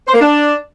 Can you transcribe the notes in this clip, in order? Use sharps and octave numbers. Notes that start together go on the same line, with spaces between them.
C5
A#3
D4